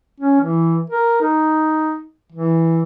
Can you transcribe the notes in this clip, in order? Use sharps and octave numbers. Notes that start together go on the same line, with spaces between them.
C#4
E3
A#4
D#4
E3